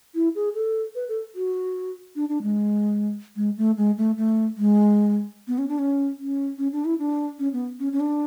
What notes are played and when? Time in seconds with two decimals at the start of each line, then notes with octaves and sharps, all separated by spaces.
0.15 E4
0.35 G#4
0.54 A4
0.95 B4
1.09 A4
1.35 F#4
2.16 D4
2.29 D4
2.43 G#3
3.36 G#3
3.57 A3
3.77 G#3
3.97 A3
4.17 A3
4.57 G#3
5.48 B3
5.58 C#4
5.68 D4
5.79 C#4
6.19 C#4
6.58 C#4
6.73 D4
6.85 E4
6.99 D4
7.39 C#4
7.53 B3
7.80 C#4
7.92 C#4
8.00 D4